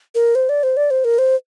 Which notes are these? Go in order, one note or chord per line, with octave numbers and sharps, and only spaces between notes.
A#4
C5
D5
C5
D5
C5
A#4
C5